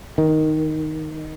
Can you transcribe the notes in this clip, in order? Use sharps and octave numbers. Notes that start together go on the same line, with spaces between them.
D#3